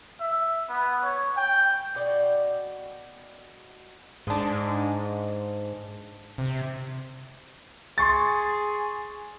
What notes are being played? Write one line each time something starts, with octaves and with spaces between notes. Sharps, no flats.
E5
B3
C#5
G5
B2 D5 G5
G#2 G#3 D4
C3
G#4 C6 C#6 A6